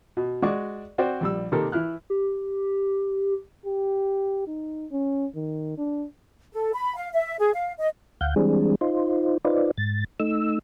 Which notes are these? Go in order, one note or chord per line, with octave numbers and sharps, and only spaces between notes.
B2
G#3 F#4 D5 C#6 D6
C4 F#4 C5 D5 G5
A#1 G3 E6
C3 D#3 A#3 G4 A4 A#4
E3 E4 F6 F#6
G4
G4
D#4
C#4
D#3
D4
A4
B5
F5
E5
G#4
F5
D#5
D2 F5 F#5 G6
E3 G3 G#3 C4 D4 G#4
D#4 F4 C5
D#4 F4 B4 C5 D5
G#2 A6
A3 D#4 E6